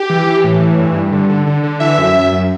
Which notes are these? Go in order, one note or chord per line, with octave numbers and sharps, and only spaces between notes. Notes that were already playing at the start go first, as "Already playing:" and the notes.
Already playing: G4
E3
E3
A2
E3
G2
G2
D3
D3
D3
D3
E3 E5
F#2
F#2
F#2